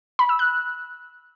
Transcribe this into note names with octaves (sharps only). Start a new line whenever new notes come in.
B5
E6
F#6